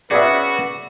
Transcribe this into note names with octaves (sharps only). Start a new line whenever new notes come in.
B3 C#4 F#4 G#4 B4 D5 E5